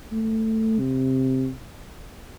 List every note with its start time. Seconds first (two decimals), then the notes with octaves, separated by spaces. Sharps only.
0.12 A3
0.79 C3